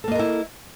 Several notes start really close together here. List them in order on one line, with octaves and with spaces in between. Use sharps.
A4 A#3 D#5 A#4 E4